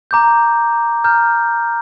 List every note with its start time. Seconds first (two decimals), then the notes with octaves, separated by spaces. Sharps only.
0.11 A#5 D6 G6
1.04 A#5 F6 G6